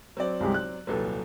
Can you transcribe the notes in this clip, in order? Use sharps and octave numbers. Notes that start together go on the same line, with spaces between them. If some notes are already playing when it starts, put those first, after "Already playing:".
F#3 C4 D5
C2 G#3 G4
F#6
D#1 C2 F#3 A4 B4